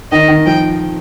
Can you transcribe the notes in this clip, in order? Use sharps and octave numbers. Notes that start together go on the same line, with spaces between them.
D#3 D#5
D#3
F3 G5